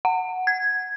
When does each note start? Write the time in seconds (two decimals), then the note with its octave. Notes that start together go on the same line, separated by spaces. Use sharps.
0.05 F#5
0.47 G#6